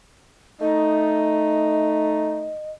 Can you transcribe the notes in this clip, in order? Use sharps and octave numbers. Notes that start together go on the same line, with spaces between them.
A3 D#4 D#5